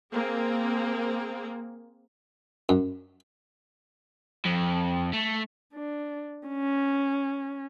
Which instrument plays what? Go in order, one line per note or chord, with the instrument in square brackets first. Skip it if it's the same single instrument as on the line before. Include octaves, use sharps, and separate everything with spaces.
[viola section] A#3 C4 G#4
[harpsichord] F#2
[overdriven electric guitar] F2
A3
[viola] D4
C#4